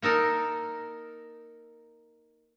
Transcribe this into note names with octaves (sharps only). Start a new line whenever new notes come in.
A#3 D#4 A4 A#4